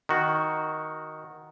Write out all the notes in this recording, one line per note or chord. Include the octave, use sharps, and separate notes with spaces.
D#3 F#4